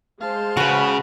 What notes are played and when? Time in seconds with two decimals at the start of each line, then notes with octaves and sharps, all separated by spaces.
0.21 G#3 C5 F5 A5
0.57 C#3 F#4 B4